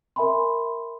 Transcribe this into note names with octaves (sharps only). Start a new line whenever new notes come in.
A#4 E5 G#5 B5 C6